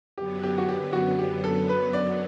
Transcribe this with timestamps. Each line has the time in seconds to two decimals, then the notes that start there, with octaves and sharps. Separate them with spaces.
0.18 F#2 D3 F#3 B3 G4
0.43 G4
0.58 F#4
0.68 G4
0.93 F#4
1.19 G4
1.44 A4
1.69 B4
1.93 D5